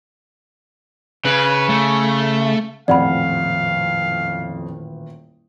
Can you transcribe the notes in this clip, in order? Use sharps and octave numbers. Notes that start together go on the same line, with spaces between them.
C#3 B4
A3
D#1 A1 F2 D5 F5 F#5 B5